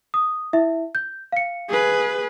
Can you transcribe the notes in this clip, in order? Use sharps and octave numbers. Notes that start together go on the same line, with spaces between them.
D#6
E4 E5
G6
F5 C#7
G#4 B4